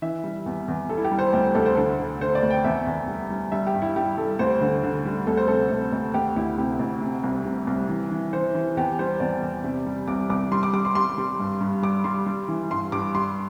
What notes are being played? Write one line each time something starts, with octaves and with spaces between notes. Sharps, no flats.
E3 E5
G3
E2
E2
G3 A4
E4
G4
G3
C5
D2 G4
D2 A4
C5
D3 A4
D3
D3 C5
D5
D2
G5
E2 E5
E2
G3
G3
G3 E5
G4
G2
E4
G3 G4
G3 A4
D2 C5
D3
D3
G3
D2 A4
C5
C3 A4
D2
D2
D2 G4
D2 E4
C3 G4
D2
C3
C2
C3
C2
E3
E3
E3 C5
E3
E2 G4
G3 C5
E2 D5
E2
C3
G3
C2 D6
C2 D6
G3 C6
D6
G3 D6
C6
G3 C6
G3
G2
G2
G3 D6
G3 C6
G3
E3
G2 C6
G2 D6
G3 C6